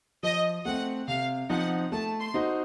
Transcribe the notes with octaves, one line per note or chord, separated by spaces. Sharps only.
F3 D#5
A3 C4 F#5
C3 F5
F3 C4 D#4 F#5
A3 A5
C6
D#4 F#4 C5 D#5